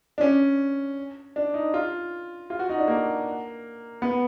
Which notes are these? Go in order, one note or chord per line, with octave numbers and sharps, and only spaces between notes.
D4
C#4
D4
D#4
F4
F4
F#4
D#4
D4
A#3
B3